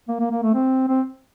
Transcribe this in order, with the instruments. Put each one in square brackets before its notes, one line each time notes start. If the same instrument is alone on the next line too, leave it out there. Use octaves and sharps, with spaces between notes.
[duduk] A#3
A#3
A#3
A3
C4
C4